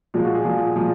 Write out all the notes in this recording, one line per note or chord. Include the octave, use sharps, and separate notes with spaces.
A#2 F3 G#3 F4
F#4
G#4
A#2 F3 G#3
A#2 F3 G#3